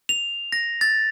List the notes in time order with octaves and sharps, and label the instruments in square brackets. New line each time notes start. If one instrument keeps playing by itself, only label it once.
[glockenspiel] F7
A#6
A6